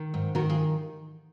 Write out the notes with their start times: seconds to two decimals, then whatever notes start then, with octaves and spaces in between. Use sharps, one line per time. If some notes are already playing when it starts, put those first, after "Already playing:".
Already playing: D#3
0.14 G#2
0.35 D#3 F#4 A#4
0.49 F4 G#4